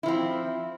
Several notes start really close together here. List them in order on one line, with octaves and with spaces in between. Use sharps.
E4 F3 C4